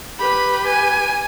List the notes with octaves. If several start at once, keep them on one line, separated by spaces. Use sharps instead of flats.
G4 B4 B5
G#5